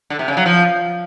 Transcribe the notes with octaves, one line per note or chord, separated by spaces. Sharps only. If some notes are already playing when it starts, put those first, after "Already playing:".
D3
C3
C#3
F#3
F3